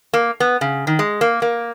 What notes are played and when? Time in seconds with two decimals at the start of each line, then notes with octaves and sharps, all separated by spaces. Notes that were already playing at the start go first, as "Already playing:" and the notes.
0.14 A#3
0.40 B3
0.61 C#3
0.87 D#3
0.99 G#3
1.21 A#3
1.42 A#3